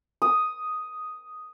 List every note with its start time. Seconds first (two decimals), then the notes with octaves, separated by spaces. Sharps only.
0.22 D#6